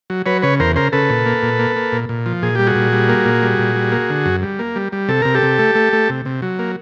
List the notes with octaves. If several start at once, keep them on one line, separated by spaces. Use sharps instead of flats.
F#3
F#3 B4 C#5
C#3 B4 C#5
E2 A#4 C5
C#3 A#4 C5
C#3 A4 B4
A#2
A#3
A#2
A#3
A#3
A#2
A#2
F3
A#2 G#4
G3 G4
F#4 G#4
A#2
G3
A#3
A#2
G3
A#2
G3
A#3
D3
F#2
G3
A#3
G3
G3
C3 A4
C3 A#4
G4 A4
C3
A3
A3
A3
C3
C3
F#3
A#3